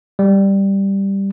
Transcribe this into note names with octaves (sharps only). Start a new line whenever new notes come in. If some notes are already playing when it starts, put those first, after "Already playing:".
G3